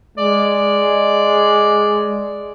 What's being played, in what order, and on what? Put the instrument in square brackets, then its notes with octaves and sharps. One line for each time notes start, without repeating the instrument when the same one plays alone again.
[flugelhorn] G#3 [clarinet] D5